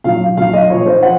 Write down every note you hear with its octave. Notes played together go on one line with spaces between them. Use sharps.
A#2 F#3 F5
A#2 F#3 F5
D#5
A#2 F3 C#5
C5
F3 F#5